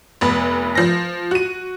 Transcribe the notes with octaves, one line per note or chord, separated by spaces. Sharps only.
F1 B3 B5
F3 A#6
F#4 D#7